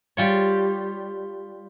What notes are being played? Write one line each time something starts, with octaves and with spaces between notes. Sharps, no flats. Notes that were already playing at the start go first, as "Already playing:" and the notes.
G3 F4 C#5